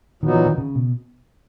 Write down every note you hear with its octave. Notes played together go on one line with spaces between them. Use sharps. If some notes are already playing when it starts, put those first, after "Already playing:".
A#2 D#3 F#3 B3 D#4 F#4
E3
D#3
C#3
B2